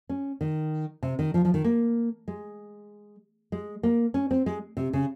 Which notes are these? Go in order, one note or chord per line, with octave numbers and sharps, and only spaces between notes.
C#4
D#3
C3
D#3
F3
F3
D#3
A#3
G#3
G#3
A#3
C#4
C4
G#3
C3
C#3